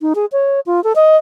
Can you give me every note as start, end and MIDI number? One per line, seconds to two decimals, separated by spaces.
0.02 0.13 63
0.15 0.26 68
0.32 0.60 73
0.66 0.83 65
0.84 0.93 69
0.96 1.17 75